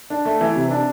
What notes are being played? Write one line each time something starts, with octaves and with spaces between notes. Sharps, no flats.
D4
A3
E3
C3
D4